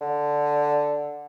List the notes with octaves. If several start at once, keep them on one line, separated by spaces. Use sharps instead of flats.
D3